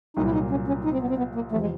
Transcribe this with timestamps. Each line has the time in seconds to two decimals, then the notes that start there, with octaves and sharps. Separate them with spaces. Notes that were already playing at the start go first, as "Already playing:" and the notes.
0.17 C2 A#2 F#3 D#4
0.25 E4
0.33 D#4
0.50 C#4
0.68 C#4
0.84 D#4
0.93 C4
1.01 B3
1.09 C4
1.18 B3
1.35 A#3
1.52 E2 C3 F3 A3
1.61 G#3